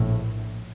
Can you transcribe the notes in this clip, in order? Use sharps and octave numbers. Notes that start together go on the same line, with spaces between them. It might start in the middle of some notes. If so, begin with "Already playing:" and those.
Already playing: A#1 A2